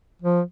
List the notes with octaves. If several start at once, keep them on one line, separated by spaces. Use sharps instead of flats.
F3